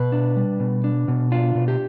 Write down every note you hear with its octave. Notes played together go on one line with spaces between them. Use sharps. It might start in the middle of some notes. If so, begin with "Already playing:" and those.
Already playing: B2 B4
D4
G3
B2
D4
B2
D4 F4
B2
G4